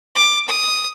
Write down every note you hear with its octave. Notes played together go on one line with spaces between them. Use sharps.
D6
D#6